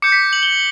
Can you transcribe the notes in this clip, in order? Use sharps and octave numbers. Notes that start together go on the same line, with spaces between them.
D6 G6 C#7
B6
F#7
G7
F#7